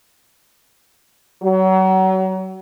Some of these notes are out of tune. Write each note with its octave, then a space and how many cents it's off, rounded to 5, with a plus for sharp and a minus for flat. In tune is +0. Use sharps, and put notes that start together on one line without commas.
F#3 +30